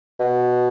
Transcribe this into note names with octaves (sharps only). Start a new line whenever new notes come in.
B2